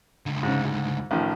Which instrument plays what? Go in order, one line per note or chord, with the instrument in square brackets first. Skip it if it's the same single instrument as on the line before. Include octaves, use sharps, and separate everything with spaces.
[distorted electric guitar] C#2 D3
[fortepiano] G#2 C#3
G#2
A1 D#3 F3